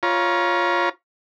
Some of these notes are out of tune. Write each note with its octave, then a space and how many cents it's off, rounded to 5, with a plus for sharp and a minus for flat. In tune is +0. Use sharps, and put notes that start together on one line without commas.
F4 +0 C#5 +0 A#5 +35